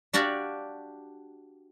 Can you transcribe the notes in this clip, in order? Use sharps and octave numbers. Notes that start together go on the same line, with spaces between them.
D4 F#4 G4 D5 F5